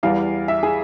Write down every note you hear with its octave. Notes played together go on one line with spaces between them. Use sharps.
E2 E3 G3 F5
E5
G#4